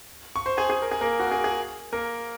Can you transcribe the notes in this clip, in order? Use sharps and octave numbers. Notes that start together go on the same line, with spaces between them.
C#6
C5 C6
G#4 G#5
G#4 G#5
A#4
G#4
A#3 A#4
F#4
A#4
G#4
G#4
A#3 A#4